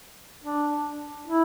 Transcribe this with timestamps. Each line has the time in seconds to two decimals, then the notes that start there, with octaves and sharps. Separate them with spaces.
0.44 D4
1.28 E4